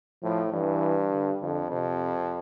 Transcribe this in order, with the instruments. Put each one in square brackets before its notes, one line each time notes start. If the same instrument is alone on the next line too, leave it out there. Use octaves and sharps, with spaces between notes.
[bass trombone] A2 [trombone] F3
[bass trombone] G2 [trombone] E3
[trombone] D3
[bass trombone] F2 [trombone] D3
[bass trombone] F2 [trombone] C3